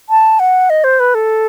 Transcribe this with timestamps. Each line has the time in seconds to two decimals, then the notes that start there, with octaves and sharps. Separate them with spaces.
0.09 A5
0.40 F#5
0.70 D#5
0.84 C5
1.00 B4
1.15 A4